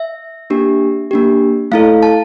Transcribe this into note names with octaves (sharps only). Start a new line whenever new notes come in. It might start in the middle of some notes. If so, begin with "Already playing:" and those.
Already playing: E5
A#3 D4 G4
A#3 D4 G4
A3 E4 A4 F5
A5